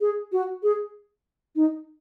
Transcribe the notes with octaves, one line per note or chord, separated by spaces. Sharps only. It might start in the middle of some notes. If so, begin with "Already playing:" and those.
G#4
F#4
G#4
D#4